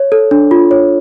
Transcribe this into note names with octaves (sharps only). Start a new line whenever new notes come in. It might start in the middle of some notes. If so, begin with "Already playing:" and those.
Already playing: C#5
A4
D4
F4
C#5